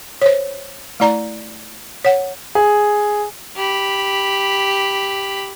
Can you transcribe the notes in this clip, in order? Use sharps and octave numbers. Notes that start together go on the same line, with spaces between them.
C5 C#5
A3 E4 D5 A#5
C#5 F#5
G#4
G4 B5